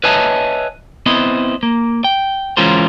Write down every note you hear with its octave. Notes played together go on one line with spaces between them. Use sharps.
B4 C#5 D#5 E5 G#5 A5
B3 C4 E4 C5 D#5
A#3
G5
E3 G#3 C#4 F4 A#4 C5